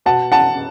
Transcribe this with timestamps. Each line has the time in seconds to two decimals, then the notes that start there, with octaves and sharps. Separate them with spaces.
0.06 B2 F#5 A5
0.32 F#5 A5